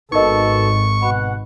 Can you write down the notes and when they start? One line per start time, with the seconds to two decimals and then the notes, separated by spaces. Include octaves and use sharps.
0.12 G#1 B3 D#4 F#4 A4 A#4 D#5 C#6
1.02 B2 F#5 B5